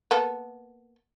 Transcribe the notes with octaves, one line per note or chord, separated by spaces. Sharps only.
A#3 B3 A4